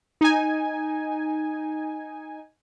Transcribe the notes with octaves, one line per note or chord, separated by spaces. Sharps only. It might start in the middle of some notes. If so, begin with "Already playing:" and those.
D#4 G#5